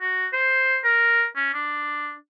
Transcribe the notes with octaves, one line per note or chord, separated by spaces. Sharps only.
F#4
C5
A#4
C#4
D4